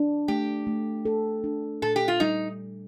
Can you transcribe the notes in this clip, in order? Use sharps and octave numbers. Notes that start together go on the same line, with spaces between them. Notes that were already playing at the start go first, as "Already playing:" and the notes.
Already playing: D4
A3 G4
A3
A4
D4
A#2 A4
G4
F4
G3 D#4